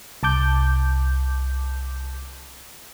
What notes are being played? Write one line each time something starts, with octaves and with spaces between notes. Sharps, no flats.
C2 A5 D6 G6